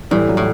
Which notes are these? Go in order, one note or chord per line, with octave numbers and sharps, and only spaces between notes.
A2 E3 G3
F#3
A2